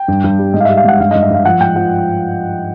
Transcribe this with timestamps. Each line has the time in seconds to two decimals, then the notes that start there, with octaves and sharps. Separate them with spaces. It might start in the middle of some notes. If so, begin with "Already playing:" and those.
Already playing: G5
0.08 G2
0.24 G2
0.39 G3
0.54 G#2 D#5
0.60 F5
0.65 G3 E5
0.77 F5
0.84 G#2 F#5
1.00 G2 F5
1.11 G2 D#5
1.23 E5
1.30 G2 F5
1.45 F3 F#5
1.60 G#2 G5
1.76 F3 F#5